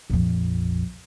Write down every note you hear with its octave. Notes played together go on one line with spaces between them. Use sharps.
A#1 F2